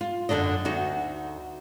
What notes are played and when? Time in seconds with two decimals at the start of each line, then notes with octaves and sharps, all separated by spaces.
0.01 F4
0.29 F#2 B2 D3 D4 D#5
0.65 D2 D#4 F#4